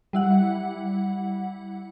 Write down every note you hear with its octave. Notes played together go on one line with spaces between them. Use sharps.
G3 E4 F#5